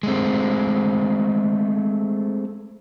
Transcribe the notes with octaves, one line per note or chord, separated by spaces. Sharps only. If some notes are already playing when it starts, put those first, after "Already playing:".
G#3 A3 C4